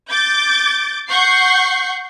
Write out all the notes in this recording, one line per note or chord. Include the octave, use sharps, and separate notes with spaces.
D6 G6 A6
F#5 C#6 G6 C7